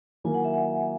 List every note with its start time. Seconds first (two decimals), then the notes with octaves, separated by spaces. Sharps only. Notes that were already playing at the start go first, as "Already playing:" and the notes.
0.24 D#3 F#3 A#3 E4 G#5
0.34 F#5
0.44 E5
0.54 F#5